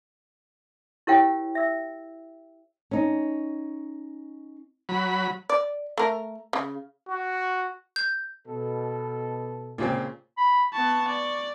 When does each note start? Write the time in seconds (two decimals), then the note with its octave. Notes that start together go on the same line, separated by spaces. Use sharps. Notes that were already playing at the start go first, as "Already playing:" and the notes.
1.07 E4 G4 A#4 C#5 F5 G5
1.55 E5 E6
2.91 C#4 D#4
4.89 F#3 B5
5.50 D5
5.98 A3 A#4
6.53 C#3
7.09 F#4
7.96 G6
8.46 B2 A4
9.78 A#2 C#3 C4
10.37 B5
10.73 B3 A5 C#6
11.08 D5